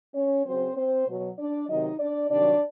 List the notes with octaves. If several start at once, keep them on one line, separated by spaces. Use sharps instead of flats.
C#4 C#5
C#3 F#3 C4 C5
C4 C5
B2 F#3
D4 D5
C3 D#3 F#3 D#4 D#5
D4 D5
C3 D#3 F#3 D4 D5